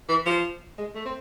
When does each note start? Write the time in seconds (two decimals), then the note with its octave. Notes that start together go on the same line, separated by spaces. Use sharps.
0.09 E3
0.26 F3
0.78 G#3
0.95 A3
1.05 C4